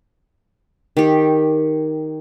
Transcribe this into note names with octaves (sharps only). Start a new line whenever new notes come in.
D#3 G4